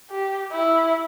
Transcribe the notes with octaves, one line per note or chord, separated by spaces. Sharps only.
G4
E4